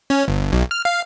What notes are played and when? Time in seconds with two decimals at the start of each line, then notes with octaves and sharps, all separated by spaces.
0.10 C#4
0.28 G1
0.52 B1
0.71 F6
0.85 F5